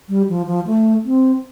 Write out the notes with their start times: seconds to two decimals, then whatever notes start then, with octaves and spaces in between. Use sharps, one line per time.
0.09 G3
0.29 F3
0.47 F3
0.67 A3
1.05 C4